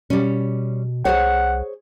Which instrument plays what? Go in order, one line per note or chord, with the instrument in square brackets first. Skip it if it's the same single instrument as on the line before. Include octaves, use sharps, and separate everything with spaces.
[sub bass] B2 [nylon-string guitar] G3 C#4
[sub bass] C2 [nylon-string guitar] G#4 C5 C#5 [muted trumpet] F#5